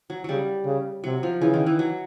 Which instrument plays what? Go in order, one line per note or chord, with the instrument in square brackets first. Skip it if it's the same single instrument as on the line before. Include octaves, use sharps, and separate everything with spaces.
[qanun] F#3
[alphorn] C#3 [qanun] F#3 G3
[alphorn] C#3
[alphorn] C3 [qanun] F#3
[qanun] F3
[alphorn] C#3 [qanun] E3
[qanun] D#3
E3
F#3